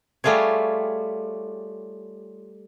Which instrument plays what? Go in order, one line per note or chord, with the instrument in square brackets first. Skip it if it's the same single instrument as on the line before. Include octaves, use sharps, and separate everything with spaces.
[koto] G3 A3 F4 G#4 C#5